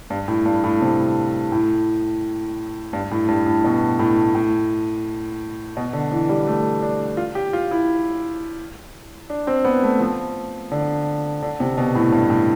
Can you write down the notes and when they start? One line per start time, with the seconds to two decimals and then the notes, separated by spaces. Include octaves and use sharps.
0.10 G2
0.28 A2
0.46 G2
0.64 A2
0.82 C3
1.52 A2
2.93 G2
3.11 A2
3.28 G2
3.46 A2
3.64 B2
3.99 A2
4.35 A2
5.77 B2
5.93 D3
6.12 E3
6.29 G3
6.47 A3
6.82 D4
7.17 F4
7.35 G4
7.53 F4
7.71 E4
9.30 D4
9.47 C4
9.65 B3
9.83 A3
10.00 F3
10.72 D3
11.42 D3
11.60 C3
11.78 B2
11.95 A2
12.12 G2
12.30 A2